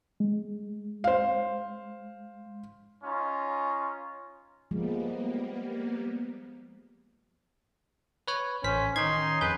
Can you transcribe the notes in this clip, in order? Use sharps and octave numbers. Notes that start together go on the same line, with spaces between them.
G#3
C5 F5
C#4 D#4 F4
F3 G3 G#3 A#3 B3
B4 C#5
A1 C#4 C5 B6
D#3 C#4 D#4 C6 G#6
F2 G#4 B4 G6